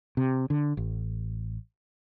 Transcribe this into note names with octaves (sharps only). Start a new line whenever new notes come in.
C3
D3
A1